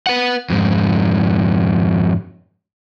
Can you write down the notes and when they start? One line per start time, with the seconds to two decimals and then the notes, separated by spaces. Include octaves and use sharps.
0.07 B4 F#5
0.50 F2 G#2